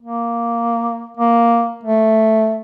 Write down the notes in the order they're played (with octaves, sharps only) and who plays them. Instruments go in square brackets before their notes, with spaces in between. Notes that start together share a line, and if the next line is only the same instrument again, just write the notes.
[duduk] A#3
A#3
A3